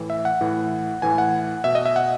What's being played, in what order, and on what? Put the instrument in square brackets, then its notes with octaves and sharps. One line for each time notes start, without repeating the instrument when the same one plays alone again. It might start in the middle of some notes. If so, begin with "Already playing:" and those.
Already playing: [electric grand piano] A2 E3
E5
F#5
A2 E3
A2 E3 G#5
F#5
B2 E5
D#5
E5
F#5